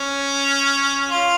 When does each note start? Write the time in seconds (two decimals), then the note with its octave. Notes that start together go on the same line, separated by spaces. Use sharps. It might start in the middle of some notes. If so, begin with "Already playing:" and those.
Already playing: C#4
1.09 F4